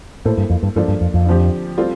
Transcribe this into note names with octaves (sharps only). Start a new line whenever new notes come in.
A2 A#3 E4 A4 C5
G2
F2
G2
G2 F3 A#3 D4 F4 A4
G2
F2
F2
D3 F3 C4 G4
G3 C4 F4 A4 D5